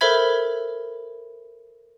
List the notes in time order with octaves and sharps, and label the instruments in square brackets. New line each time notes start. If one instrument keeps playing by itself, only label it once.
[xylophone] A4 A#4 C5 E5 B5 G#6